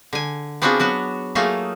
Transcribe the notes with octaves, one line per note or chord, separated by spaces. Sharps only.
D3 G#5
B3 C4 D4 F4 F#4 G#4
F#3 B3 F#4
F#3 A3 A#3 D#4 F4 G#4